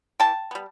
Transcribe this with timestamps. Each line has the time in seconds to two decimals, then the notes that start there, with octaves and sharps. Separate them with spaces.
0.20 E3 G5 A5
0.51 G3 B3